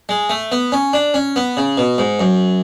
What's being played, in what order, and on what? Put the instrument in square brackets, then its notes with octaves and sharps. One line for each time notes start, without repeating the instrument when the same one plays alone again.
[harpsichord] G#3
A3
B3
C#4
D4
C#4
B3
C#3
B2
G#2
F#2